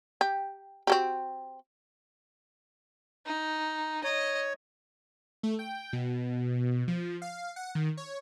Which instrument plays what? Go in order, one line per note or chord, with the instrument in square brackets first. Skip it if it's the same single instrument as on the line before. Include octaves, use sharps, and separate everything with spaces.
[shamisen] G4
C4 F#4 G4
[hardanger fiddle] D#4
[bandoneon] C#5 [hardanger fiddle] D#5
[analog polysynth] A3
G5
B2
F3
F5
F#5
D#3
C#5